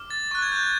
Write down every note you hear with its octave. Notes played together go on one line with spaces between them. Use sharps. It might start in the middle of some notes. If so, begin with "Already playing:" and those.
Already playing: D6 F6
A6
C#6 F#6 A6
G#6
G6
G#6